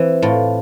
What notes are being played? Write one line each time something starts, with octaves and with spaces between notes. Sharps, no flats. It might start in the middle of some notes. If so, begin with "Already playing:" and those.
Already playing: E3 C4
A2 F4